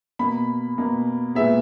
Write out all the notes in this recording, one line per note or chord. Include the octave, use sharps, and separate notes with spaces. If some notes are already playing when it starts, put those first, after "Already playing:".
B2 A#3 B5
B2 A#3
A#2 G#3 B3 E5